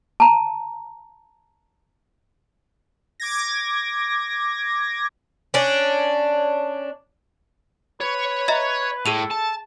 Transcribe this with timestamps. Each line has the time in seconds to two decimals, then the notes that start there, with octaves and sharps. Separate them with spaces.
0.20 A5 A#5
3.20 D6 G#6 A#6
5.54 C#4 D4
8.01 B4 C#5
8.48 D#5 E5 A#5
9.06 A2 G#4 A4 D#7 F7
9.30 A5